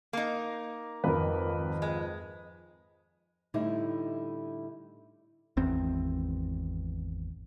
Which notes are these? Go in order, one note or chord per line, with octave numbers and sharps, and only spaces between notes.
A#3 D#4
G#1 F2 F4 A#4 B4
G#3
A2 D3 G3 D#4 E4
G#1 E2 C4